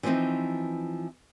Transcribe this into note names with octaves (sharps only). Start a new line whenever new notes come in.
E3 F3 G3 C4 D#4